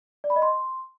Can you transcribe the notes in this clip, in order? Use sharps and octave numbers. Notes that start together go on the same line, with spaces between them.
D5
B5
D#5
C6